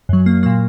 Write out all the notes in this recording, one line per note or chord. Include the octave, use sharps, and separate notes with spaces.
F#2 F#3
A#3
A#2 F#3 A#3